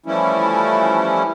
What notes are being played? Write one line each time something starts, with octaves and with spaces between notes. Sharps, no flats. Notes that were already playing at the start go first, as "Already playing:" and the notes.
E3 F3 G3 A3 C#4 E4